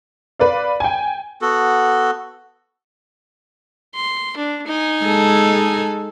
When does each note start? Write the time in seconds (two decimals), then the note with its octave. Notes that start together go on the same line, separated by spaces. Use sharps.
0.39 B4 D5 F5
0.80 G5 G#5
1.42 B3 F#4 A4
3.95 C6
4.37 D4
4.67 D#4 G#5
5.04 G#3 A4